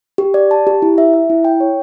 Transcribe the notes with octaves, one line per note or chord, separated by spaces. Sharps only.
G4
D5
A5
G4
E4
E5
E5
E4
G5
C#5